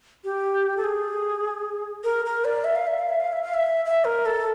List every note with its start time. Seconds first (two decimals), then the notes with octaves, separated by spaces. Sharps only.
0.24 G4
0.77 A4
0.84 G#4
2.04 A#4
2.25 A#4
2.45 D5
2.64 E5
2.75 F5
2.87 E5
2.99 F5
3.09 E5
3.20 F5
3.32 E5
3.43 F5
3.54 E5
3.85 E5
4.05 A#4
4.26 A4